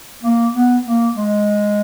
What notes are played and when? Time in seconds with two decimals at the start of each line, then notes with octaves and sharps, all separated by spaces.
0.23 A#3
0.54 B3
0.85 A#3
1.16 G#3